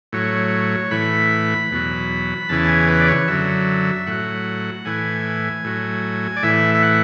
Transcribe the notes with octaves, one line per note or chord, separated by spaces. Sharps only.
A2 F#3 C#5
A2 E3 B5
E2 B2 F#3
E2 C#3 E3 A5
G#5
B4
D5
C#5
F#2 D3 F#3 E5
A2 F#3 F#5
A2 E3 G#5
A2 F#3
D5
A2 E3 E5
E5
F#5